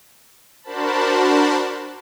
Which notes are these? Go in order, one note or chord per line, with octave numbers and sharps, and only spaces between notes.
D4 F#4 A#4 C5 A5 B5